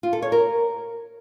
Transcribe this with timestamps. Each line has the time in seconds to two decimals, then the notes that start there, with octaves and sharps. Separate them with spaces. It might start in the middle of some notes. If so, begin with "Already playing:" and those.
0.03 F4
0.13 A4
0.22 C#5
0.32 A#4